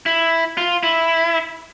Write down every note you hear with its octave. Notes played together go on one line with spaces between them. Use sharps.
E4
F4
E4